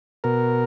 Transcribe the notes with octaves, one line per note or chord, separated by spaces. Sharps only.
B2 A#4